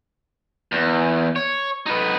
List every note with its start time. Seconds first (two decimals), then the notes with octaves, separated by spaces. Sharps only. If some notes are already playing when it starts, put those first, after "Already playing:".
0.72 E2
1.36 C#5
1.86 D#4 B4